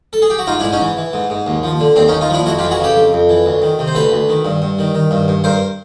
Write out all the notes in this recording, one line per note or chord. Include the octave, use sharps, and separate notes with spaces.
A4
G#4
G4
F#4
G#2 D#4 F4
D4 E4
G#2
C#4 D#4
E3
E3
G#2
G#2
D#2
F3
D3
D#2 C4 D4
C#4 D#4
D#2
D#4 F4
F3 D4 E4
F2 E4 F#4
F4 G4
E3
F#4 G#4
C#3 G4 A4
F2
F2
E3
D2
D#3
C3
C5
D2 A4 B4
D2
D#3
G2
G2
D#3
D#3
G2
G2
G2 A#4 C5